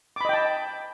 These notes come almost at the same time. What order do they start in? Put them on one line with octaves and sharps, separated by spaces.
D6 B5 D#5 G5 A5